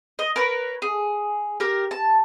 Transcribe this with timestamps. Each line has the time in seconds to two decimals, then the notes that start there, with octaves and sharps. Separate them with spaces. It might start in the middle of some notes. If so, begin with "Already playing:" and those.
0.19 D#5
0.36 A#4 B4 C#5
0.82 G#4
1.60 G4 A#4
1.91 A5